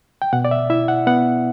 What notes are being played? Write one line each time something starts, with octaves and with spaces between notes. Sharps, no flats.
G5
B2 F#5
D5
E5
E4 E5
F#5
B3 F#5